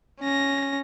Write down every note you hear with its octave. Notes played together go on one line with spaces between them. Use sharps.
C#4 A#6